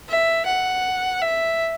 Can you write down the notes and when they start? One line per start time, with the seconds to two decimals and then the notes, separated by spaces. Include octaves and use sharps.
0.08 E5
0.46 F#5
1.22 E5